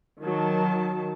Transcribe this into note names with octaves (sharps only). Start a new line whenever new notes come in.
D#3 F#3 A5